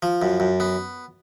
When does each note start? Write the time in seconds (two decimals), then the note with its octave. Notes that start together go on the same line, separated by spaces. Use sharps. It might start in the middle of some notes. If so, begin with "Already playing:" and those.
0.02 F3
0.22 F#2
0.40 F#2
0.60 B3